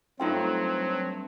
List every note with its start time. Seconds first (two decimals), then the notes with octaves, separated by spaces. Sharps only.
0.20 G2 F#3 A3 C4 D#4 F4 G5